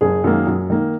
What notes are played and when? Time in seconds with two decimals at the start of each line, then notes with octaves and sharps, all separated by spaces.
0.01 F#1 G#4
0.24 F#2 D#3 A#3
0.47 F#2
0.70 D#3 A#3